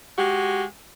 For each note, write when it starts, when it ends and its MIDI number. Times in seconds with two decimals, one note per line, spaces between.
0.18 0.63 56
0.18 0.63 66
0.18 0.63 67